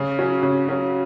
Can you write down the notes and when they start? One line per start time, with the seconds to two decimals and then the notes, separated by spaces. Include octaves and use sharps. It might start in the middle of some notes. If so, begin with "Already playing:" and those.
Already playing: C#3
0.18 F#3 C#4 F#4
0.43 C#3
0.68 F#3 C#4 F#4